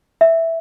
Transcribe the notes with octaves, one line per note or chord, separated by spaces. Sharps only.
E5